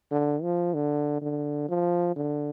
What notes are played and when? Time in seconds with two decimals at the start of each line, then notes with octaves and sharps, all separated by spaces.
0.11 D3
0.43 F3
0.74 D3
1.22 D3
1.69 F3
2.16 D3